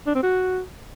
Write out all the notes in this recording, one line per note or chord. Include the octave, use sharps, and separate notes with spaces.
D4
C4
F#4